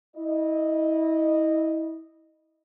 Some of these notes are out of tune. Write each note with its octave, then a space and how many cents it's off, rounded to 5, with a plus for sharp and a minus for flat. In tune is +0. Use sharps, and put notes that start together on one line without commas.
E4 -30 D#5 -15